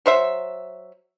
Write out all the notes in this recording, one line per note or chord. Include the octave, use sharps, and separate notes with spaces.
F#3 C5 E5